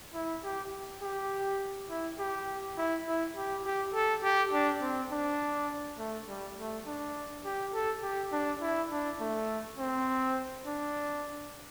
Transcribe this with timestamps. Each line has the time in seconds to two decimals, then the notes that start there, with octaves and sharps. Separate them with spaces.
0.14 E4
0.44 G4
1.02 G4
1.90 E4
2.19 G4
2.77 E4
3.06 E4
3.36 G4
3.65 G4
3.94 A4
4.23 G4
4.53 D4
4.82 C4
5.11 D4
5.98 A3
6.28 G3
6.57 A3
6.86 D4
7.45 G4
7.74 A4
8.03 G4
8.32 D4
8.61 E4
8.91 D4
9.20 A3
9.78 C4
10.66 D4